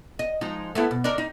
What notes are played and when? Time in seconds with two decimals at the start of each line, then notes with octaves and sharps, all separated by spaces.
0.19 D#5
0.41 F3 G#3 D#4
0.75 A3 B3 E4
0.91 B2
1.04 D4 D#4 A#4
1.18 D#4